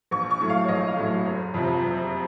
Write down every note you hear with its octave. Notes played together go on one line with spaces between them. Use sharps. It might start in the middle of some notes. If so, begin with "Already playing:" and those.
A#1 C#6
C#6
A2 F#3 A3
F5
C#5
A#1 D#5
F5
A2 F#3 A3
F#1
F2 C3 F3
F#1